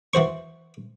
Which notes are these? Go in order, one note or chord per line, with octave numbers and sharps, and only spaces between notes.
E3 F#4 C5 C#6